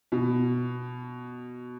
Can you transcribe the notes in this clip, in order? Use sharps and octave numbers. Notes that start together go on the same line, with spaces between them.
B2